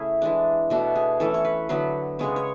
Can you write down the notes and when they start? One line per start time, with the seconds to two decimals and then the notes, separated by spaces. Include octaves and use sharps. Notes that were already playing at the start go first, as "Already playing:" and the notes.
Already playing: C#3 A3 C#4 E4 G#4
0.22 E3 G#3 D4
0.70 B2 A3 D4 F#4
0.96 G#4
1.20 E3 A3 C#4 A4
1.34 C#5
1.45 B4
1.69 D3 F#3 B3 B4
2.19 C#3 G#3 B3 C#5
2.36 C#5